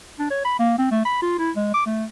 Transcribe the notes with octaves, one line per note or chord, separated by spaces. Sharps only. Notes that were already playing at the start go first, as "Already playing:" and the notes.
D4
C#5
B5
A#3
C4
A3
B5
F4
E4
G#3
D6
A3